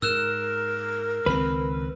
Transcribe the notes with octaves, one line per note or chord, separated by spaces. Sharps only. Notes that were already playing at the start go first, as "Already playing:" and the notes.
G#2 A#4 E6 F#6 E7
C#2 D#3 C4 B4